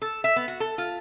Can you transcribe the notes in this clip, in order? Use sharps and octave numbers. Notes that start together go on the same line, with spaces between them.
A4
E5
B3
F#4
A4
F4